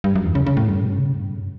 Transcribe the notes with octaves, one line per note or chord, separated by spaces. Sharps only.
G2
F#2
E2
C#3
C#3
A2
G2
B2
C#3
G2
F#2